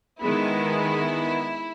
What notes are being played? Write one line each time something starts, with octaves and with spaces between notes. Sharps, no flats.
D#3 G#3 B3 E4